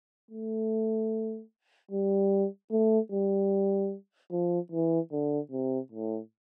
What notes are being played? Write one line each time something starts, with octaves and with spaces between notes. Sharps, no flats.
A3
G3
A3
G3
F3
E3
D3
C3
A2